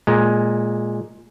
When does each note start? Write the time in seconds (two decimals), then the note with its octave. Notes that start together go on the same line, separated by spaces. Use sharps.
0.07 A#2 G#3